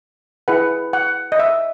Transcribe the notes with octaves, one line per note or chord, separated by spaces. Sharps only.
E4 G#4 B4 F#5
F#5
D#5
E5